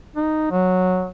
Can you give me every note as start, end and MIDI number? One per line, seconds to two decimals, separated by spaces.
0.16 0.46 63
0.51 1.09 54